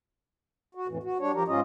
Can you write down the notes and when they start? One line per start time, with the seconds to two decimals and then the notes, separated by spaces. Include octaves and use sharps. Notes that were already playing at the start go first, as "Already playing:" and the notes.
0.75 F#4
0.88 F2 A2 E3
1.03 F#4
1.20 G3 D4 C#5
1.34 F3 G4 A#4
1.48 G#2 C#4 F4 D#5